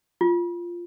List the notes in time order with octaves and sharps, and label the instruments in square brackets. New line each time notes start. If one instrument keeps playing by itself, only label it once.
[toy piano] F4